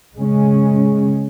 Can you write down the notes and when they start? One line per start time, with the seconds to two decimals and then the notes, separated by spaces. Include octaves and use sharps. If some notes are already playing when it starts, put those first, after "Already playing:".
0.15 C#3 G#3 C#4